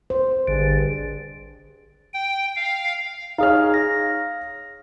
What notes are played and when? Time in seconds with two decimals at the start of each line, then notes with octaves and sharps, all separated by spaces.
0.10 C5
0.48 G#1 G2 D3 G#4
2.14 G5
2.56 F5
3.38 D#4 G#4 C#5 F5 F6
3.74 A#6